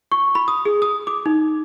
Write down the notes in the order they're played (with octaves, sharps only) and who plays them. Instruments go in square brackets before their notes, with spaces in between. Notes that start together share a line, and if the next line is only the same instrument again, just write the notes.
[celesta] C#6
B5
D#6
G#4
D#6
D6
D#4